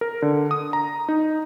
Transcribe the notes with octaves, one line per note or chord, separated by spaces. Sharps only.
A#4
D3
D#6
A#5
D#4